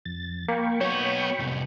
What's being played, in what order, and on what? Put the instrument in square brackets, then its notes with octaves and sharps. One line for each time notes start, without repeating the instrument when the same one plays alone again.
[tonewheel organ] F2 A6
[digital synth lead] A#3 [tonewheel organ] G5 B5 C#6
[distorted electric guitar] F#3 B3 [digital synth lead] C#5
[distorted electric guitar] C2 F2